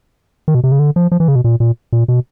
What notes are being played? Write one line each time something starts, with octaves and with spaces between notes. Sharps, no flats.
D#3
B2
C3
C#3
D3
F3
F3
E3
C#3
B2
A#2
A#2
A#2
B2